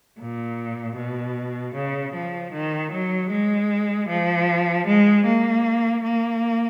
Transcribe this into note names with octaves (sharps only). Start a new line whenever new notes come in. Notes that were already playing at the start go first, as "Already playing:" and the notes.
A#2
B2
C#3
F3
D#3
F#3
G#3
F3
G#3
A#3
A#3